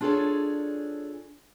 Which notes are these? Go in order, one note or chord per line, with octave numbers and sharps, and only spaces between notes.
D4 F4 G#4 A4 C#5 D5